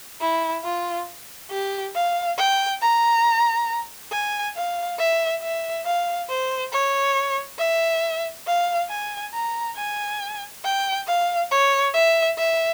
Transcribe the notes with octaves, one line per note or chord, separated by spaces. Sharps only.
E4
F4
G4
F5
G5
A#5
G#5
F5
E5
E5
F5
C5
C#5
E5
F5
G#5
A#5
G#5
G5
F5
C#5
E5
E5